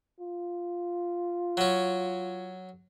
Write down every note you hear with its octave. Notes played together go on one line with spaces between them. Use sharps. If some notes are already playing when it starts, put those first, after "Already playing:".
F4
F#3 C#4